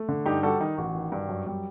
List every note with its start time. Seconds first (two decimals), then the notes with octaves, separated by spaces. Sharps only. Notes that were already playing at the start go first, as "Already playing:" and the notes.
Already playing: A3
0.08 D3
0.26 G2 D#4 G4
0.43 G3 F#4 A4
0.60 D#3 D#4
0.77 A1 F#4
0.95 D#3
1.12 G2
1.29 F#2
1.47 G3